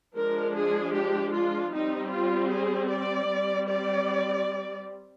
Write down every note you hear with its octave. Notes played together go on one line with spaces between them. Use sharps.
F3 G#3 D4 A#4
G#4
G4
F4
G3 C4 D#4
F4
G#4
D5
G3 C4
D5